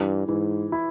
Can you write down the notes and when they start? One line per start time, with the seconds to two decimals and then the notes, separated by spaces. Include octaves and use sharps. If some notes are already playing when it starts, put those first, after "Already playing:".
Already playing: G2 E3
0.28 G#2 E3
0.72 E4